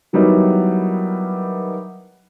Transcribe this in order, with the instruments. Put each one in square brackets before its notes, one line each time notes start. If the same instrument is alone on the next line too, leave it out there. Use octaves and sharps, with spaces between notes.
[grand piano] D#3 F#3 G3 B3 D#4 E4